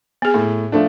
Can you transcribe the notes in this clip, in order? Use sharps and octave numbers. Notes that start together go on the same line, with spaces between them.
B3 G#4
A2
F3 A3 D4